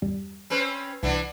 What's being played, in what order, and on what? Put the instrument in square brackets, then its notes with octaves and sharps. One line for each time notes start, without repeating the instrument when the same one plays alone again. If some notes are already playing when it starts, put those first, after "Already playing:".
[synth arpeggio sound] E2 G2 G3
[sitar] C4 C#4 B4
[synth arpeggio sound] C2 [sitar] E3 B3 D4